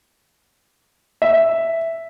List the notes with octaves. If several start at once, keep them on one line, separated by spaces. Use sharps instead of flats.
E5